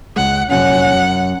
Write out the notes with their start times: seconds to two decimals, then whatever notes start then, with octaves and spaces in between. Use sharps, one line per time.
0.16 C#2 G#3 F#5
0.51 F1 A#1 F#2 C#4 F#5
0.92 F#2